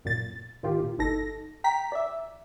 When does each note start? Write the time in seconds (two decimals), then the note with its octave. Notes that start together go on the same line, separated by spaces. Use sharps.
0.05 F#2 A#2 A6
0.63 A2 D#3 F4 G4
0.80 A#2
0.99 G1 D#4 A4 A#6
1.64 G5 A#5 B6
1.92 D5 E5